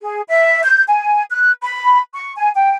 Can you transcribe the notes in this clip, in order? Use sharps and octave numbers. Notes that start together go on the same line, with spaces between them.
G#4
E5
G6
G#5
F#6
B5
C#6
G#5
G5